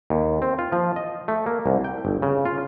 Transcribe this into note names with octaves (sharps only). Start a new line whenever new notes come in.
D#2
C4
F4
F3
D#5
A3
A#3
C2
G5
G1
C#3
F4